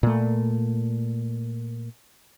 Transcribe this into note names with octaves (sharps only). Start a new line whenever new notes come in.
A#2 A3